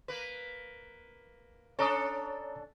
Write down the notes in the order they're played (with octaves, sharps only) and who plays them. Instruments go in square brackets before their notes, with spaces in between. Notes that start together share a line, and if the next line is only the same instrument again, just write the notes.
[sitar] A#3 B4
[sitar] C#4 D4 A4 [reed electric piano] C#5 A#5 D#6